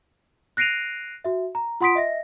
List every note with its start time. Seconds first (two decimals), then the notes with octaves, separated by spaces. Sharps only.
0.57 F#6 A#6 C7 D7 D#7 F7
1.24 F#4 E5
1.55 A#5
1.81 F4 F#5 C6 D#6 B6 D7
1.95 D#5 E5 A#6